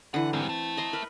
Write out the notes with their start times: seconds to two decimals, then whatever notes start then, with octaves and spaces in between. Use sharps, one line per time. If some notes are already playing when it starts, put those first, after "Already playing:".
0.14 D3 E3 F#5
0.33 G#2 G3 C4
0.49 E5 A5
0.77 D#5 A#5 C6
0.93 A#4 B4